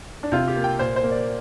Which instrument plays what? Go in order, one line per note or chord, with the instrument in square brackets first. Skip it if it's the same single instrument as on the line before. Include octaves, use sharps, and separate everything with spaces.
[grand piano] D4
C3 F4
G4
A#3
G5
A#2 C5
C5
A#3
D5